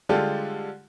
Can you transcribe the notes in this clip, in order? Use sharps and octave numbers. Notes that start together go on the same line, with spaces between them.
D3 G3 G#3 F4 G4 A4